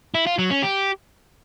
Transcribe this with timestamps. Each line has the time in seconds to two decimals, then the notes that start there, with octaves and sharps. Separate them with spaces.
0.15 E4
0.26 F4
0.38 F#3
0.50 C#4
0.62 G4